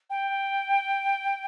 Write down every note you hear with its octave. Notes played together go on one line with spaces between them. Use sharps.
G5